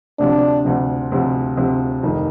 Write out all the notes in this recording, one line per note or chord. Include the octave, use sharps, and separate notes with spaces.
D2 C3 F3 D4
D2 C3 F3
D2 C3 F3
D2 C3 F3
F1 F2 D#3